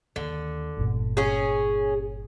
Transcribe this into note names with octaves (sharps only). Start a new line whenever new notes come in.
D#2 D3
G1 A#2
C#4 G#4